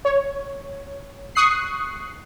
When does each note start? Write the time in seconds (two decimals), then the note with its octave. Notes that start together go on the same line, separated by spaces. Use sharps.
0.05 C#5
1.35 C#6 D#6 F#6 C7